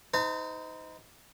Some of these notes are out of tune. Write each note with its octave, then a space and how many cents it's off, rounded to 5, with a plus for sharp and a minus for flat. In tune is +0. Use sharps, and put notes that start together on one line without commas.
D#4 +20 C5 -40 A#5 -45